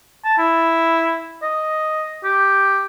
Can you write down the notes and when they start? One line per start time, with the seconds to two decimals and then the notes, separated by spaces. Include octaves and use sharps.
0.25 A5
0.38 E4
1.42 D#5
2.24 G4